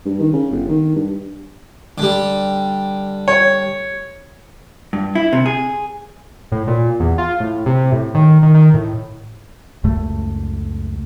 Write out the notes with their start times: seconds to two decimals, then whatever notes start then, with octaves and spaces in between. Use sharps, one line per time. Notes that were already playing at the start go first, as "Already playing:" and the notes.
0.05 G2
0.20 D#3
0.33 C#3
0.51 G1
0.69 D#3
0.95 G2
1.98 D3 G3
3.28 C#5
4.93 G2
5.15 E4
5.33 C3
5.46 G#4
6.52 A2
6.67 A#2
7.00 E2
7.18 F4
7.40 A2
7.66 C3
7.92 A2
8.15 D#3
8.43 D#3
8.55 D#3
8.74 A2
9.84 C#2 F#2 C#3 A3